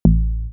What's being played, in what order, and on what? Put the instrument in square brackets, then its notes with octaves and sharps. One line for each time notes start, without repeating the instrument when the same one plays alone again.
[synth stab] A1